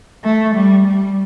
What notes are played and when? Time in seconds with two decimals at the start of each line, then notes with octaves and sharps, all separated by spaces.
0.24 A3
0.55 G3
0.86 G3